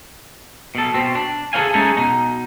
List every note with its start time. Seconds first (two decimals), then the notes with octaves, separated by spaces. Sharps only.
0.75 B2 A4
0.94 B2 C4
1.15 D4
1.53 G#4 A4 C5 C#5 F5 G#5
1.74 G#3 C#4 D#4 E4 G#4 A4
1.97 B2 D#4